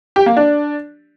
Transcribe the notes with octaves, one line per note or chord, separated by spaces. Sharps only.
G4
A#3
D4